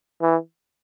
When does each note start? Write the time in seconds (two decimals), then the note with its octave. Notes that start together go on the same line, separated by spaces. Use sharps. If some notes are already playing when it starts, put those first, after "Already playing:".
0.22 E3